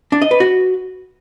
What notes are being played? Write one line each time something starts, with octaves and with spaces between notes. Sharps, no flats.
D4
D#5
B4
F#4